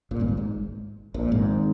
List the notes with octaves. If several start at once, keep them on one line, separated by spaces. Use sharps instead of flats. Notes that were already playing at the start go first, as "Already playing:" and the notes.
A#1 A#2
G#1 G#2
G2
G#1 G#2
A#1 A#2
G#1 G#2